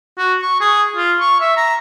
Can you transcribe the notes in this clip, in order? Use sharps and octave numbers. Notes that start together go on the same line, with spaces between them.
F#4
C#6
G#4
F4
C#6
E5
A#5